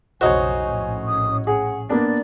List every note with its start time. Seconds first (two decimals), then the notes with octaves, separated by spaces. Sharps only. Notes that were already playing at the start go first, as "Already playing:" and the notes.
0.21 B1 F2 C#3 D#4 F#4 C5 C#5 G#5
0.58 A#1 A2 C#4
1.08 D#6
1.47 G#4 F#5
1.90 A#3 B3 D4 D5